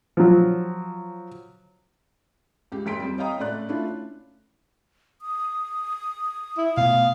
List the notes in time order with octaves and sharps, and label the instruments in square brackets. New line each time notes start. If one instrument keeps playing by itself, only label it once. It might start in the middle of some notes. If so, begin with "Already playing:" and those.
[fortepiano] F3 F#3
[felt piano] C#2 G4
F#1 G5 C6 B6 D7
F2 G3
C#5 D#5 F5 G5 A#5 D#6
A2 C#3 A3 D5 F#6
A3 C#4 D4 E4 F4
[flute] D#6
[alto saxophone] E4
[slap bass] B2 A3 [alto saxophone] F5